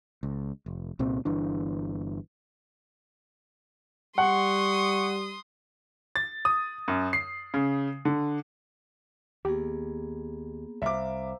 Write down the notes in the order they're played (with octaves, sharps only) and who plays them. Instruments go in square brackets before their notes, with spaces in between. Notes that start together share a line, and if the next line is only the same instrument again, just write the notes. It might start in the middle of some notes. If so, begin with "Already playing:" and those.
[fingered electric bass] C#2
F1
C2 A#2 C4
G1 E3 D4
[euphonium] G3 [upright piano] F#5 [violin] C6 D#6 [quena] C#6
[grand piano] A6
D#6
F#2
C7
C#3
D3
[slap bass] D#2 [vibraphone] A#3 B3 G#4 [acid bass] G4
[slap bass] C2 [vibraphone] C5 F5 A#5 [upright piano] E5 D6